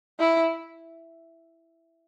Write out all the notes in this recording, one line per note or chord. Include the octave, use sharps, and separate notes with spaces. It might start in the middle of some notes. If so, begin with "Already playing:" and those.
E4